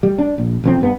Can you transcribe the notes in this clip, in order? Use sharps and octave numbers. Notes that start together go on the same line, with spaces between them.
G3
D4
A#1
E1 F2 C4
G2 B3